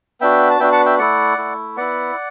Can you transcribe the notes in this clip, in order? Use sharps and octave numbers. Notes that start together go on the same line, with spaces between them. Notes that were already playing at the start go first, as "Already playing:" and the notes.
B3 D4 F#4 E5 G5
A5
B3 D4 F#4 E5 G5
F#5 A5
E5 G5
A3 E4 D5 F#5
A3 E4
B3 E4 D5 F#5